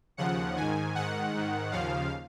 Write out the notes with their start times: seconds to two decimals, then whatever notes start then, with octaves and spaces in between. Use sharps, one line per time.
0.17 D#2 C#3 F3 F#5
0.56 G#2 D#3 G#5
0.94 G#2 D#3 F#5
1.34 G#2 D#3
1.71 D#2 C#3 F3 F5